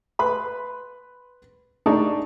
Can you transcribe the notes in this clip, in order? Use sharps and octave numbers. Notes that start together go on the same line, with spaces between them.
B4 B5 C6
D4 D#4 G#4 D5 A5 C#6